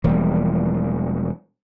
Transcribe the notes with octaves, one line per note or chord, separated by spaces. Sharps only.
E1 E3 F3 G3 A#3